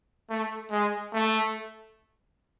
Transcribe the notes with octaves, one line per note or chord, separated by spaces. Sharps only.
A3
G#3
A3